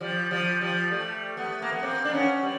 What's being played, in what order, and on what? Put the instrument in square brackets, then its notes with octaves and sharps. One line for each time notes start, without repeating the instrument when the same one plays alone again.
[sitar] F3 G3
F3 G3
F3 G3
G3 A3
A3 B3
A#3
B3
A#3 C4
D4
B3 C#4
G3